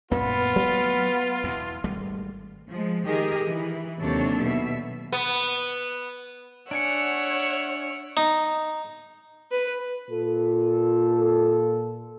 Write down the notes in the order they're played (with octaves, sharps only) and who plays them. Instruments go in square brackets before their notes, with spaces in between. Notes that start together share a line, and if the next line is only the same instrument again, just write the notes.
[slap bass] F#2 A#2 [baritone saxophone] B3 [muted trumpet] F4
[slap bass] F#3 A3 A#3
E2 B2
G#1 G3 A3
[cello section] F3 G#3
D#3 G4 G#4 A#4 D#5
E3
D#2 C3 F#3 D4 A4 C#5
B2 E5
[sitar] B3
[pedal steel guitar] D4 G#5 [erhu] C#5 [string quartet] E5 F#5 F6 [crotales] C#7 D7
[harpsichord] D#4
[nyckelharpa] B4
[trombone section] A#2 F4 A4